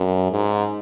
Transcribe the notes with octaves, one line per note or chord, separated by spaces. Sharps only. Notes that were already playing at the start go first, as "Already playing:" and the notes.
Already playing: F#2
G#2